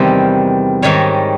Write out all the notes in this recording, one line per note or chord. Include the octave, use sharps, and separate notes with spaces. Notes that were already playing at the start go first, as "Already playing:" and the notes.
Already playing: E2 C3 D#3 G3 C5
G#2 D#3 G3 C#5